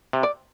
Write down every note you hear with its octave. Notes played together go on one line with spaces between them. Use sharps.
C3
D5